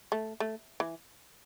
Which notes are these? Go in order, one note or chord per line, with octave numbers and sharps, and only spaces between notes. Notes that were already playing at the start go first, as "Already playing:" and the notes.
A3
A3
E3